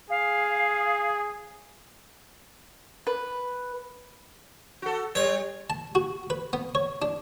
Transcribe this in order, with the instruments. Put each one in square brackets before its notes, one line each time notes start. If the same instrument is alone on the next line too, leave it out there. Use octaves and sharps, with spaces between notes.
[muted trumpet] G#4 [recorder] F5
[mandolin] B4
[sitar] F#4 A4
[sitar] G3 [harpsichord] C#5
[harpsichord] A5
F#4
B4
B3
C#5
D4